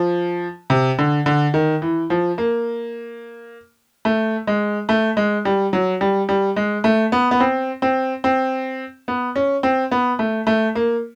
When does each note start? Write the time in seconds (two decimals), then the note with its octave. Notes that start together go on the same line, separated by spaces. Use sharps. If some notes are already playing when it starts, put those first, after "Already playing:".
Already playing: F3
0.70 C3
0.99 D3
1.26 D3
1.54 D#3
1.82 E3
2.10 F3
2.38 A#3
4.05 A3
4.47 G#3
4.89 A3
5.17 G#3
5.45 G3
5.73 F#3
6.01 G3
6.29 G3
6.56 G#3
6.84 A3
7.12 B3
7.31 B3
7.40 C4
7.82 C4
8.24 C4
9.08 B3
9.36 C#4
9.63 C4
9.91 B3
10.19 A3
10.47 A3
10.75 A#3